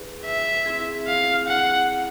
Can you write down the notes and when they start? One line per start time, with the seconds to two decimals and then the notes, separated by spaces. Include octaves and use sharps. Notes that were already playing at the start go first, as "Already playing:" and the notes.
Already playing: E4 G#4 B4
0.26 E5
0.66 C4 E4 G#4
1.08 F5
1.48 F#5